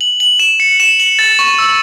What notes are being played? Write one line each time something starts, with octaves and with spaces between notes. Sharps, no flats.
F#7
F#7
E7
C#7
E7
F#7
A6
C#6
E6